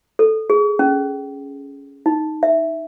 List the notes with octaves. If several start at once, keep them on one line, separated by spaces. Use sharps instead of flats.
A4
G#4
C#4
D#4
E5